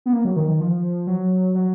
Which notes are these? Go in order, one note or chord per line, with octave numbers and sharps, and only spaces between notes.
B3
A#3
F#3
D#3
D#3
F3
F#3
F#3